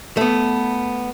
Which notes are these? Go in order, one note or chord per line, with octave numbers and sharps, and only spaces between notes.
A3 B3